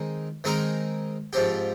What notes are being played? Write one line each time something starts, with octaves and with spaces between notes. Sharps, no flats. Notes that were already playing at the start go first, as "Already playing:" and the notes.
Already playing: D#3 G#3 C4 D#4
D#3 G#3 C4 D#4 A#4
G#2 F3 C4 G4